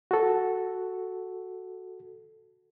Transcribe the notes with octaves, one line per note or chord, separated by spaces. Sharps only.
F#4 A4